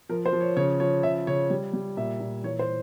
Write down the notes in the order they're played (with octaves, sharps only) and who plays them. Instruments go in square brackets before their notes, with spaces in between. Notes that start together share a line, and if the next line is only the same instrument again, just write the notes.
[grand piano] F3 A#4
C5
F3
C#5
C#3 C#5
F3 C#5
C#3 E5
C#3 C#5
G3
G3
A#2 E5
A#2
E3 C#5
C5